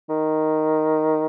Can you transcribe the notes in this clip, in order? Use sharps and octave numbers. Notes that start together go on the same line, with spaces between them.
D#3